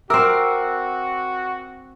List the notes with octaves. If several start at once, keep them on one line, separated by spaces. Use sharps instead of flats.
C4 F#4 A#4 E5 D6 E6